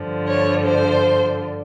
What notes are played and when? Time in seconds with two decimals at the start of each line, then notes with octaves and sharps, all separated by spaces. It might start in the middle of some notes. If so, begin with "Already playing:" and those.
Already playing: G2 D3 F3
0.27 C#5
0.65 C5